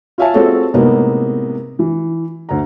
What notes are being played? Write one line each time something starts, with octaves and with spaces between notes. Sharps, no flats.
F4 C#5 E5 F5 G#5 A5
C4 F4 F#4 G#4 A4 C#5
A2 C3 G#3 A#3 B3 D#4
E3
D2 A#5